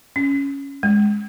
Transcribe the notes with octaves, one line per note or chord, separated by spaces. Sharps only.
C#4
G#3